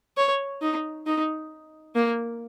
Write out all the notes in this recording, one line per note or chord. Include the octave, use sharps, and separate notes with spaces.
C#5
D#4
D#4
A#3